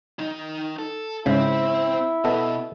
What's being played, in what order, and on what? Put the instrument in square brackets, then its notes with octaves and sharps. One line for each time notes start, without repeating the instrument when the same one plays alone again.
[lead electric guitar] D#3 D#4
A4
[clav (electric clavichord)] G#2 C#3 [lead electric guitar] C4 [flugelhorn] E4
[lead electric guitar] B2 [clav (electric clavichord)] B3 A4 D#5